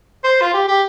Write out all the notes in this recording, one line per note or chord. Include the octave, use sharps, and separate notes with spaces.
C5
F4
G4
G4